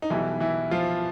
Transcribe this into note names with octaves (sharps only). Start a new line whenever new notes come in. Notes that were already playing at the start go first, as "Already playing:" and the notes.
D#4
B1 B2 E3 G3 E4
E3 E4
F3 F4